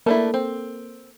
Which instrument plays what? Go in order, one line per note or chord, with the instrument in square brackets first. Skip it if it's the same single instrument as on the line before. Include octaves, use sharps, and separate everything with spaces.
[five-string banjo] A3 D4 E4 [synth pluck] A#3 A4 A#4
[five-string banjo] C4